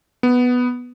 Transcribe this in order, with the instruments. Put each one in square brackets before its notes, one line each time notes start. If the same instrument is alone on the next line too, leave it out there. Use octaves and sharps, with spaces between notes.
[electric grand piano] B3